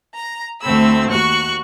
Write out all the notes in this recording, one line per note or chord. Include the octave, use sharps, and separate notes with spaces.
A#5
D2 A3 C4 B5 E6
D#2 F#4 C#6 F#6